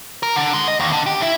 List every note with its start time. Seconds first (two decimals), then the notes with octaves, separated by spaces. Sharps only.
0.23 A#4
0.36 D3
0.54 G#3
0.68 D#5
0.80 D#2
0.92 D3
1.06 G4
1.22 E4